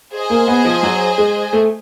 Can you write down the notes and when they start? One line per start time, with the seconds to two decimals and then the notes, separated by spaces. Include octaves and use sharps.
0.13 G#4 C5 D#5 G#5
0.30 A#3
0.48 B3
0.65 F3
0.83 F#3
1.18 G#3
1.53 A3